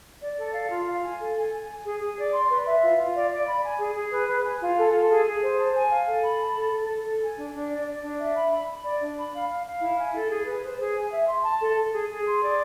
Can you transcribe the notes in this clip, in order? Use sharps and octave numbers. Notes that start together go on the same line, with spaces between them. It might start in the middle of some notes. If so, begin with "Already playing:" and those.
D5
A4
F5
F4
F5
G#5
A4
G#5
G#5
G#5
G#4
G#4
D5
C6
B4
E5
F4
F4
D5
D5
B5
G#5
G#4
G#4
B4
B4
G#5
F4
A4
A4
G#4
G#4
C5
A5
G#5
F5
A4
B5
A5
A4
A4
A4
A4
G#5
D4
D4
D5
D5
D4
E5
B5
B5
B5
D5
D4
B5
F5
F5
F5
E4
G#5
A4
G#4
B4
C5
G#4
G#5
E5
C6
A5
A4
A4
G#4
G#4
C6
D5